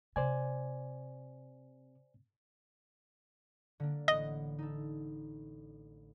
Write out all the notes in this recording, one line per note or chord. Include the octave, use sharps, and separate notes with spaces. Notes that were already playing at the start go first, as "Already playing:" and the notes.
C3 C5 D5 G#5
D3 A#3 D4
A1 D#5 F#5
D#4 A4